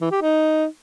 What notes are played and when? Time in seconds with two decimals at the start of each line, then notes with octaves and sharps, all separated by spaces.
0.01 E3
0.12 G4
0.22 D#4